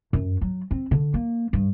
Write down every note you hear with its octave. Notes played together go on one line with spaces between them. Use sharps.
F#2
F#3
C4
D3
A#3
G2